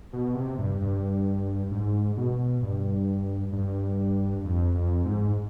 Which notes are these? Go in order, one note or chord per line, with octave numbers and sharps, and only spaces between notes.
B2
C3
G2
G2
G#2
B2
G2
G2
F2
F2
G#2